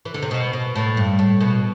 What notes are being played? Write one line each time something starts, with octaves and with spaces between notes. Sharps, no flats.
E3
D3
C3
B2
B2
A2
G2
A2
B2